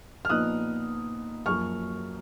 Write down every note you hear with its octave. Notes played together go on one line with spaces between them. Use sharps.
F6
A#2 F3 B3 D#4 D#6 F#6
F#2 F3 A#3 C#6 F6